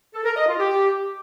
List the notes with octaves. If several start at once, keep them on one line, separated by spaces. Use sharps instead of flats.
A4
A#4
D#5
F4
G4